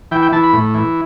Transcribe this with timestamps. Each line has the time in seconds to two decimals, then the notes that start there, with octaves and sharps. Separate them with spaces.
0.11 E3 G5
0.22 G5
0.32 E3 A5
0.43 B5
0.53 A2
0.74 E3